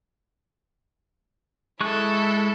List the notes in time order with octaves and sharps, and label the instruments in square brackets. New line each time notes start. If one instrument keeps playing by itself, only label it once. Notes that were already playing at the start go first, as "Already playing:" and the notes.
[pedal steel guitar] G#3 C#6 F#6 [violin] E4 A4